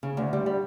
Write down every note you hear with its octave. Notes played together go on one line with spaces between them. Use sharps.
C#3
D2
G3
G3